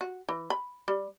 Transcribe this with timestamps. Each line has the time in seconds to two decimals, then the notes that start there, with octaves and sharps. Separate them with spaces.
0.01 F#4
0.29 E3
0.50 B5
0.88 G3